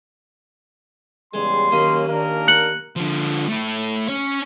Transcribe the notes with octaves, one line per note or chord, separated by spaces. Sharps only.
E2 C#3 G3 G#3 C6
D#2 F#3 A#3 C#4 D#5 B5
D#3 A#3 D4 A#4
F#6 C#7 F#7
D3 F3
A3 E4
C#4 C#5